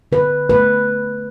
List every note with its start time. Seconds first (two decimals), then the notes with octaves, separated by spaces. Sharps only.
0.12 D3 B4
0.49 A3 B4